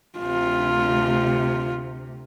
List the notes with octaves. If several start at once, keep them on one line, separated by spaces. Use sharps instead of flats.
D2 C3 F4